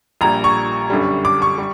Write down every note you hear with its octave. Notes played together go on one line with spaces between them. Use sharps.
A#1 A#2 G3 A#5
C#6
G1 F#2 D3 G3
D6
C#6
G3